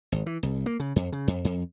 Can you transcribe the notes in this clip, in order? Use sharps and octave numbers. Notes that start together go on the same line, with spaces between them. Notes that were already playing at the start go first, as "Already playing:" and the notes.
G#1
E3
C2
A#3
C#3
F2
C#3
F2
F2